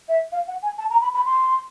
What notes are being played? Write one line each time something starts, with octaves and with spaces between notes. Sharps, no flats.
E5
F5
F#5
G#5
A5
A#5
B5
B5
C6